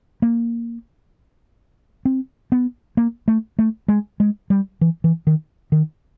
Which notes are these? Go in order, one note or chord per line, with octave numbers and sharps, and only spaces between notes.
A#3
C4
B3
A#3
A3
A3
G#3
G#3
G3
E3
E3
D#3
D#3